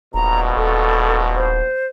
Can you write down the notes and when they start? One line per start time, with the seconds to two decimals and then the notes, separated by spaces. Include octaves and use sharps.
0.14 D#1 A#1 B2 A#5
0.57 D#1 A4
1.36 C5